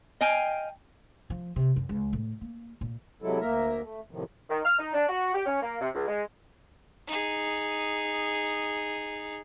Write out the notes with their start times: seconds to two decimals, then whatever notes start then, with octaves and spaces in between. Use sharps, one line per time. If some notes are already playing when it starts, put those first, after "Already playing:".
0.21 D#5 F5 G5 G#5
1.30 F3
1.56 C3
1.76 F#2
1.89 C#2
2.13 A2
2.41 A#3
2.81 A#2
3.22 C3 F#3 G#3 E4 A4
3.41 D2 A#3 A#4 E5 A#5
3.81 A3
4.11 A2 C3 D#3 F3
4.50 D#3
4.65 F6
4.78 D#4
4.94 D4
5.09 F#4
5.34 G4
5.46 C#4
5.62 A#3
5.81 C3
5.95 C#2
6.08 G#3
7.07 D#4 G#4